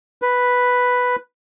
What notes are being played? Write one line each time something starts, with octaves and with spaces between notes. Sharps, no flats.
B4